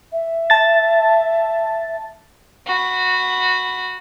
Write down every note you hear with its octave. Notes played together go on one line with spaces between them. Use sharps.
E5
A5 A6
F#4 B5